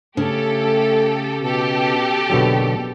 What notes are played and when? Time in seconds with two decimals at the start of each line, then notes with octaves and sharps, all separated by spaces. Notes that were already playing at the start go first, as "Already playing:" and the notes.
0.17 C#3 A3 G4 A4
1.42 B2 G4 A4
2.30 F#1 B2 D3 F#3